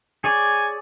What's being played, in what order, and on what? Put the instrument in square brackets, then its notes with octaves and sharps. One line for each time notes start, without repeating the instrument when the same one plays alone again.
[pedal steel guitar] G#4 C#5 D5 [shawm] G#5